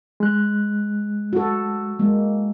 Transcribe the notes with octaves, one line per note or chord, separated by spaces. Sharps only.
G#3 F#6
F#4 A4
G#3 A#3